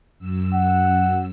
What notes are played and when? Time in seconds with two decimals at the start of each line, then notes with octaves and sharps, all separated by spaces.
0.19 F#2 E6
0.54 F#5